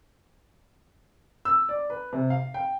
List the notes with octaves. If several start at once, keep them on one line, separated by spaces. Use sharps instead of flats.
E6
D5
B4
C3
F5
G5